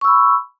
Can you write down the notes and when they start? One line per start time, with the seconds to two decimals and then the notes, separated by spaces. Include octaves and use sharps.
0.01 C#6
0.04 E6
0.07 B5